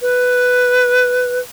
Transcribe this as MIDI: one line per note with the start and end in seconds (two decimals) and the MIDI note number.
0.02 1.39 71